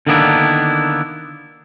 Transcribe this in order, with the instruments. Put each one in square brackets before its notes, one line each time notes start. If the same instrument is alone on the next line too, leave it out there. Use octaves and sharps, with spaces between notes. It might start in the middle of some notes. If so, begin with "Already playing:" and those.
[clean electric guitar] D3 D#3 A#3 B3 D4 E4